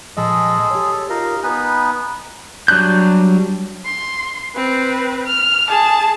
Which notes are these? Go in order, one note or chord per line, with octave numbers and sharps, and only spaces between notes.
A#2 F3 G#3 G#4 A4 D#5
G4 C#5
A4
D#4 F4 G4 A#4 D#5 F5
B3 D#4 B4 G#5
F#3 G3 D4 F#6 G6
C6
C4 B4
F6
G#4 A5